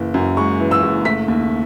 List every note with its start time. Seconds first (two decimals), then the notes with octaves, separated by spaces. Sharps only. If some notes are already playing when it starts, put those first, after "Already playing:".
Already playing: F#1 E3
0.14 F#2
0.37 G#3 C#6
0.60 E3
0.71 E6
0.82 F#1
1.05 A3 B6
1.28 D#2